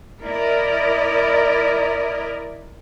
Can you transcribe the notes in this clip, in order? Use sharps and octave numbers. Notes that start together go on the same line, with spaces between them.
E4 A#4 D5 D#5